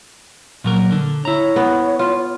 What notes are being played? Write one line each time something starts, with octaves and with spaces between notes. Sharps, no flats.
A#2 F#3 A#4
D3
E4 C#5 A#5
B3
F4